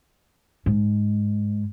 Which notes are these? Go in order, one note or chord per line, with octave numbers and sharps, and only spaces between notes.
G#2